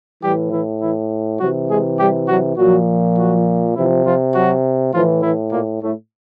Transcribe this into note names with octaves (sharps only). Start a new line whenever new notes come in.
A2 E3 G3 G4
E3 E4
E3 E4
C3 E3 F#3 F#4
G#3 G#4
G3 G4
F#3 F#4
A#2 F3 F#3 F#4
F#3 F#4
C3 E3 F3 E4
F3 F4
F#3 F#4
A2 E3 F3 F4
E3 E4
A#2 A#3
A2 A3